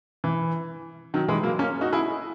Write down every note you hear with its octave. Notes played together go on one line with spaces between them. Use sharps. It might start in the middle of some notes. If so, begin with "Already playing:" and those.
E3
D#3 F#3
E3 G#3
F#3 A#3
A#3 C#4
D#4 F#4
E4 G#4